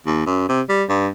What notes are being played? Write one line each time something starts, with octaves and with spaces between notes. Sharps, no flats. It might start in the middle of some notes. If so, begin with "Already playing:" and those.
D#2
F#2
C3
G3
G2